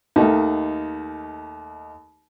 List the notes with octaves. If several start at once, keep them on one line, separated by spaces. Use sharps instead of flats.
D#2 D#3 A3